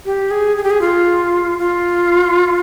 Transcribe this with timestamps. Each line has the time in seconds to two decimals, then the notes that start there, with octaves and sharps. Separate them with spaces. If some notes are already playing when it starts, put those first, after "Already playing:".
0.06 G4
0.31 G#4
0.57 G#4
0.64 G4
0.71 G#4
0.81 F4
1.59 F4